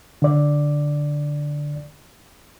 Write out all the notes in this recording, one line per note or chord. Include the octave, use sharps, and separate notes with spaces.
D3 D5